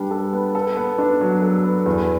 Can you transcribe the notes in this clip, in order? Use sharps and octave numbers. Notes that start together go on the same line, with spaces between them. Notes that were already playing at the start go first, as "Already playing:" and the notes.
Already playing: G3 B3 D4
A4
B3
A4
B3
D4
F#3
A4
B3
E2